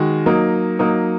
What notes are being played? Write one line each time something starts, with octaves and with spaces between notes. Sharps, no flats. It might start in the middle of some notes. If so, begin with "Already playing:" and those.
Already playing: D#3 G#3 F#4
F#3 A#3 D#4
F#3 A#3 D#4